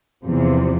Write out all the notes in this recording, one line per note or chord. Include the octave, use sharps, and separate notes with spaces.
E2 C3 F3